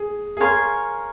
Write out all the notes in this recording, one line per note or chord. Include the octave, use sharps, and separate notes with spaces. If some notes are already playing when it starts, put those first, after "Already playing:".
Already playing: G#4
G#4
A#4 C#5 F5 G#5 C6